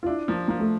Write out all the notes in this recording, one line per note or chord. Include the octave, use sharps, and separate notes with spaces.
F4
D4 E4
F3 A#3
F3 A#3
A3